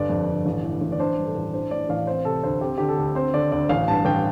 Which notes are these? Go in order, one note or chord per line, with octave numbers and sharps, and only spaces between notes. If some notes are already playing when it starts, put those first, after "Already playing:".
Already playing: G1 D5
F2
G1
A1
A2
A1
D5
D4 C5
G2
A4
A1
D4 C5
A2 D5
A1 F5
C4 C5
C3 A4
D2 C5
C4 G4
D3 G4
A4
D2
C4 C5
D3 D5
D2 D5
A1 F5
G2 A5
A1 G5